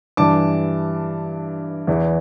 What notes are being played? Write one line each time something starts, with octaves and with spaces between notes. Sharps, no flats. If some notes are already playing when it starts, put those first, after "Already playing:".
G2 E3 A5 D6
E2 E3